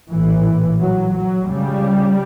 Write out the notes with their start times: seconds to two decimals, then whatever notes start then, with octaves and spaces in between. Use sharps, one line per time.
0.12 A#1 A2 E3
0.80 F#3
1.13 F#3
1.47 C#2 C#3 G3